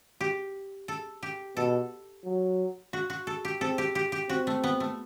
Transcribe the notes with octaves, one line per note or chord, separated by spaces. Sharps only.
G4
A4
G4
B2 A4
F#3
F#4
F#4
A4
G4
C4 A4
G4
G4
G4
C4 F#4
A3
B3
A3